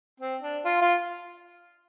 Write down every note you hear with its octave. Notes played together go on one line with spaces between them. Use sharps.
C4
D4
F4
F4